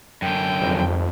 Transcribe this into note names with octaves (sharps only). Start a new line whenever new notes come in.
F#2 D3 G5
G#1 F2